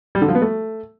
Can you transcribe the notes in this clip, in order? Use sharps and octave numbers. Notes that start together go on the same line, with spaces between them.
G3
D3
F3
B3
A3